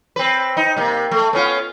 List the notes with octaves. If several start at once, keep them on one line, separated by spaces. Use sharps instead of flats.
C4 B4
D#4
C3 A#3
A3
B3 C#4 F4